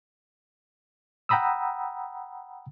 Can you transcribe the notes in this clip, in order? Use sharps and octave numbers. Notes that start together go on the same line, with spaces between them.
F#5 G5 A#5 B5 D#6 E6